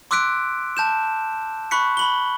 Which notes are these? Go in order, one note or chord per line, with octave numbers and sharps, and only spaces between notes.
C6 D6 E6 F#6 B6 D7
A5 G6 E7
B5 C#6 F#6 B6 C#7
B5 F#7 G7